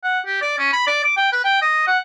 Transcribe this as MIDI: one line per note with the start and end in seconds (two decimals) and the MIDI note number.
0.04 0.20 78
0.26 0.41 67
0.42 0.54 74
0.59 0.71 61
0.73 0.87 83
0.87 1.03 74
1.04 1.14 86
1.17 1.29 79
1.32 1.43 71
1.44 1.61 79
1.62 1.85 75
1.87 1.98 78